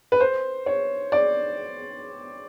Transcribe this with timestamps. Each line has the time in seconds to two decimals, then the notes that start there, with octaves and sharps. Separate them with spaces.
0.12 B4
0.20 C5
0.66 C#5
1.12 D5